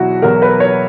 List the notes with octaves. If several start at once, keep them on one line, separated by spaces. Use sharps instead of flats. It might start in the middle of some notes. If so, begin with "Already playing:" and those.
Already playing: E2 B2 F#3 E4 F#4
E2 B2 F#3 A#4
B4
C#5